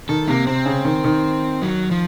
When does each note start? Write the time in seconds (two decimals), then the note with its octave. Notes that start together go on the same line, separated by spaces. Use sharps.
0.09 D#3 A4
0.28 C3 A#3
0.47 C3 C4
0.66 C#3
0.85 D#3
1.04 D#3
1.62 F#3
1.91 F3